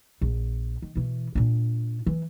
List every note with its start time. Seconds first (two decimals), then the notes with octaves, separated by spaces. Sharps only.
0.21 A#1
0.82 D#3
0.96 B2 E3
1.35 A#2 D4
2.06 E3